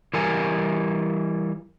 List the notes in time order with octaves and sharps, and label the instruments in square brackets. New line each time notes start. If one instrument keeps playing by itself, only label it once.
[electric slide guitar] E3 G3 A#4 G#5